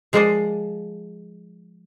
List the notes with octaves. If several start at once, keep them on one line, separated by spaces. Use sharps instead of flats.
F3 G#3 A#4 C5 D5 D#5